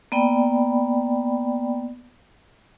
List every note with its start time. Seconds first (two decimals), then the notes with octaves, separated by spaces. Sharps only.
0.12 A#3 B3 D5 G5 B5